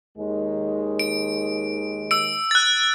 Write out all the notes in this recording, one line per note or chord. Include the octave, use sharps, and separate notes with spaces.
D#2 D#3 G#3
D7
E6 D7
F#6 A6